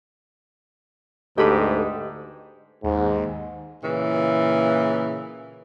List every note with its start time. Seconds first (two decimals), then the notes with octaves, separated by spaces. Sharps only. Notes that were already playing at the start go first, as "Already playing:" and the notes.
1.38 D2 G#2 G4 A4 B4 D#5
2.84 D#2 G#2
3.83 A#2 C#3 E3